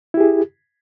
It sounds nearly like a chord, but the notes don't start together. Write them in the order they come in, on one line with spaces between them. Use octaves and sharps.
E4 G4 G#4